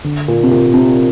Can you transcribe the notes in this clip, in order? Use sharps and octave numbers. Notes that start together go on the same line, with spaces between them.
D3
A#2
C3
A#2
C3